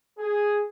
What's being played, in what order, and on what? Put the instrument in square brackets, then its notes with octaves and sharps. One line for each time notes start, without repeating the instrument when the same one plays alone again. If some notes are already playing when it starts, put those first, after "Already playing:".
[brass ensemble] G#4